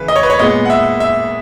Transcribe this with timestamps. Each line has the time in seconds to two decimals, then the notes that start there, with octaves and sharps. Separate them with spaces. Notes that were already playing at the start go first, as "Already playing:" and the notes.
Already playing: C#3 E3 B4
0.08 D#5
0.16 C#5
0.23 B4
0.30 C#5
0.39 A#2 G#3 B3 D#5
0.65 F#5
0.70 E5
1.00 E5